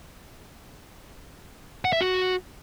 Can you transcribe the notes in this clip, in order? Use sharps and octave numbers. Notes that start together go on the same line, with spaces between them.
F#5
E5
F#4